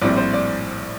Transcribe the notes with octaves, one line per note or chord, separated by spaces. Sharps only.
A#1 A2 G3 C4 D5
C5
D5